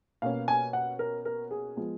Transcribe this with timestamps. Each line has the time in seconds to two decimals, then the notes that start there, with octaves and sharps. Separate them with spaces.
0.22 B2 A#3 C#4 F5
0.48 G#5
0.73 F#5
0.99 A#4
1.25 A#4
1.51 G#4
1.76 F3 G#3 B3